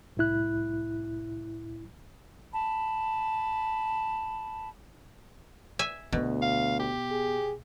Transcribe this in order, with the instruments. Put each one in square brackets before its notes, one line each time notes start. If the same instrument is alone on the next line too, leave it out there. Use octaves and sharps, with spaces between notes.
[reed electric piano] C2 A2 E4 F#6
[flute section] A5 B5
[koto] E5 G#5
[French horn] D2 [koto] B2 [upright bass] B3
[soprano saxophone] F5
G4
[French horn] G#4